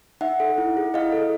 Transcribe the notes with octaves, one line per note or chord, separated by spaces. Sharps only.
D#4 E5 F#5
A4
E4
G#4
E4 D#5 F5
A4